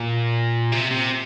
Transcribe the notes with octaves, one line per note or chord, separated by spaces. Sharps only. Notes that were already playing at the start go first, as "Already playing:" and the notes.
Already playing: A#2
C3
C3